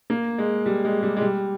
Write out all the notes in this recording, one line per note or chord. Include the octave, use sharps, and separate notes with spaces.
A#3
G#3
G3
G#3
G3
G#3
G3